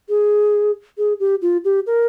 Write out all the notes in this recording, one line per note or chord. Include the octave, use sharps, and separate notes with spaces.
G#4
G#4
G4
F4
G4
A#4